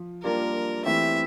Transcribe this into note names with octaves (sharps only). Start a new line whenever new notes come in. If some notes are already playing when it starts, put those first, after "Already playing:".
Already playing: F3
G3 A#3 D4 F4 A#4
E3 A3 C4 E4 G4 E5